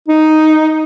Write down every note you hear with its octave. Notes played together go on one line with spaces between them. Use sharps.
D#4